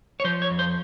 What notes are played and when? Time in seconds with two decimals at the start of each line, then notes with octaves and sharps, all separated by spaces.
0.20 C#5
0.24 F3 C5
0.42 C#5
0.50 F2
0.59 C5